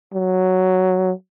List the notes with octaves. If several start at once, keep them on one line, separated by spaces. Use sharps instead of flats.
F#3